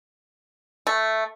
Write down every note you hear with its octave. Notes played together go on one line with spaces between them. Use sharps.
A3